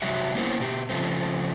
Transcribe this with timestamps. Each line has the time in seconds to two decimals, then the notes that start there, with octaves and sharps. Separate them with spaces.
0.02 C3 F#3 G3 F#4 E5
0.35 A#3 B3 C#4 E4 A#4 C5
0.60 B2 G4
0.90 C#3 F3 A3 C4